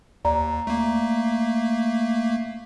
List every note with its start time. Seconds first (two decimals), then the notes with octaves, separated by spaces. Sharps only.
0.25 D#2 D5 A#5
0.67 A3 A#3